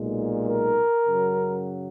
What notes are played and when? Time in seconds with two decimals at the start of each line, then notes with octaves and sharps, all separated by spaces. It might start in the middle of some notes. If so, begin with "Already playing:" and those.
Already playing: B1 A#2 G#3
0.47 A#4
1.05 F#2 C#3 F#3